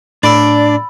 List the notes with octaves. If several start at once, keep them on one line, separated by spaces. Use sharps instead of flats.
A2 D4 D5 B5 E6